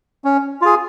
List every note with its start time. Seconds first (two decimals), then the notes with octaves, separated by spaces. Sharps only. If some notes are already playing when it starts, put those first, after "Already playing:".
0.24 C#4
0.61 F4 G#4